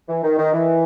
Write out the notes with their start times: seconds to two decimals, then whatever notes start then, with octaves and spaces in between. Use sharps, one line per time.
0.09 E3
0.23 D#3
0.38 D#3
0.54 E3